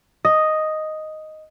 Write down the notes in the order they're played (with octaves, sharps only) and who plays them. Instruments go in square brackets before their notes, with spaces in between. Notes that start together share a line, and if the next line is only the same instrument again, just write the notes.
[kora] D#5